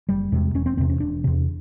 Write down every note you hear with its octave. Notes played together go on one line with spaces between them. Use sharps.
F#1 G3
E2 C3 G#3
E1 C#4
C4
E2 C3 C4
C#4
E1 D4
E2 C3